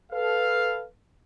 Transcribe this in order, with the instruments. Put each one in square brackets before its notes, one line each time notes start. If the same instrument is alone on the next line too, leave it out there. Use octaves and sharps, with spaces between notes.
[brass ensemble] A4 B4 F5